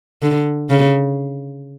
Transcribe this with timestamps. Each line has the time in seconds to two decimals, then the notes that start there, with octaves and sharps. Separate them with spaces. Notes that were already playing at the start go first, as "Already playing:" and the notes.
0.22 D3
0.70 C#3